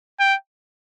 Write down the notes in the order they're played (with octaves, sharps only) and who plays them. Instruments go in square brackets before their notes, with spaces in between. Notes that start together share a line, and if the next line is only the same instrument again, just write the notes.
[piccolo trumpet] G5